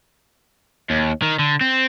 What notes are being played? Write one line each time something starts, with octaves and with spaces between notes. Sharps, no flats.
D#2
D#3
D3
C4